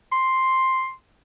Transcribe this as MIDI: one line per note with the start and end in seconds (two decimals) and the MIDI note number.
0.12 0.92 84